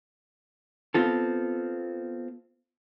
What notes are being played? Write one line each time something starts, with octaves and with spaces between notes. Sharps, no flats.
B3 C4 F4 A4